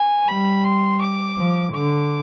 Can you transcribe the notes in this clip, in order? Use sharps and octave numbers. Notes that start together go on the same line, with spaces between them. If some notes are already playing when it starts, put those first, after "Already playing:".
Already playing: G#5
G3 B5
C6
D6
F3
D3 D6